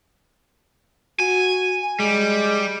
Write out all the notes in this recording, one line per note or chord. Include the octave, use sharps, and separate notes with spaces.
F#4 G#5
G3 G#3